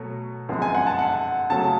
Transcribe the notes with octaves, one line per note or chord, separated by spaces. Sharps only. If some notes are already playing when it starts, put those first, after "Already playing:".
Already playing: B2 F#3 A3
F#2 D3 F3 G#3 B3
G#5
F#5
A5
F#5
C#3 F#3 A3 A5